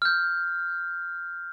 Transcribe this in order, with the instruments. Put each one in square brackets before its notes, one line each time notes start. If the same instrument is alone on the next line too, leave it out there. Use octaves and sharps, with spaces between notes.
[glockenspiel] F6 G6